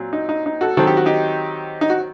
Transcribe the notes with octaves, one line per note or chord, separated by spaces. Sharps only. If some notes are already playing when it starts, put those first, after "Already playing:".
Already playing: A#2 F#3 C4
D#4
D#4
D#4
F#4 A4
D#3 F#3 C4 A4
G4
F#4
D#4 G4
D#4
F#4